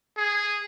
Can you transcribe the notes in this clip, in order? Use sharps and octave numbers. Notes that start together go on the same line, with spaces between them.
G#4